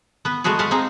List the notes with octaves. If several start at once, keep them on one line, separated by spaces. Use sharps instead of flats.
B3 B4
G#3 A3 B3 F#4 G#4
G#3 B4 F5 F#5 A5
C4 D#4 G#4